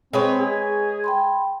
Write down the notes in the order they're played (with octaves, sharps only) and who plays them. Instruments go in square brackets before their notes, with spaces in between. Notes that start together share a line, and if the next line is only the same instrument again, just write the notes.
[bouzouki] G#3 B4 C#5 [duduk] C4
[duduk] G#4
[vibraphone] G5 B5 C6